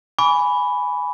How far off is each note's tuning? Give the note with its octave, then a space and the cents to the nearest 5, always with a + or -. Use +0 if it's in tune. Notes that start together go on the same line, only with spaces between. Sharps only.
G#5 +0 B5 +0 D6 -40